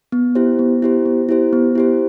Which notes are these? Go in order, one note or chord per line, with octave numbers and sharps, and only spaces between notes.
B3
E4 G4 C5
B3
E4 G4 C5
B3
E4 G4 C5
B3
E4 G4 C5